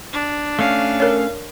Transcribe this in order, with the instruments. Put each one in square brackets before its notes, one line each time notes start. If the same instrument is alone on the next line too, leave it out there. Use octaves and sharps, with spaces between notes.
[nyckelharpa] D4
[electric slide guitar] A3 C#4 [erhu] F5
[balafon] A#4 C#5